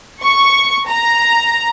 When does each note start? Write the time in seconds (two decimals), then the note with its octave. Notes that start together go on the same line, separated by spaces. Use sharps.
0.23 C#6
0.88 A#5